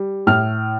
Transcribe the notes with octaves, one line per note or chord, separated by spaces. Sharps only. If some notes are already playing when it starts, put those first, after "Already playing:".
Already playing: G3
A2 F6